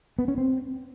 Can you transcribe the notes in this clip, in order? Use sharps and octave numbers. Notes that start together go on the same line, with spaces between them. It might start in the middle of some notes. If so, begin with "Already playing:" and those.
B3
C#4
C4